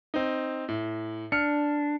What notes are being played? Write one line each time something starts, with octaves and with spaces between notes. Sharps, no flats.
C4 D#4
A2
D4 F6 C#7